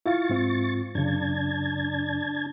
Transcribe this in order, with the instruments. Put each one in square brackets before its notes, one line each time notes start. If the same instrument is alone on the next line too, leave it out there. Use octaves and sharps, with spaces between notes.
[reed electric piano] E4 F4 F5 [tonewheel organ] C#6 A6
[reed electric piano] G#2 C4 F4
[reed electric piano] F#2 C#3 [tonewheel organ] D4 A5 G#6